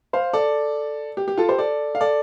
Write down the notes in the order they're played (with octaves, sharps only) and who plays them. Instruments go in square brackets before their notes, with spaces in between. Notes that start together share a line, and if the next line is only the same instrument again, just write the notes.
[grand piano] C5 F5
A4 D5
G4
G4
F4 A4
G4 C5
A4 D5
F5
A4 D5